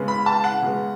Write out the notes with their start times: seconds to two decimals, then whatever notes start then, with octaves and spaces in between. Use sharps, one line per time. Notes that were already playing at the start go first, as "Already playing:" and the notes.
Already playing: C#3 G#3 B3
0.08 B5
0.26 A5
0.44 F#5
0.62 C#3 G#3 B3